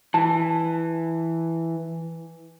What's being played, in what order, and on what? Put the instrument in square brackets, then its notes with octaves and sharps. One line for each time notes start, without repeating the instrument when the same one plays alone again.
[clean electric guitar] E3 [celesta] A5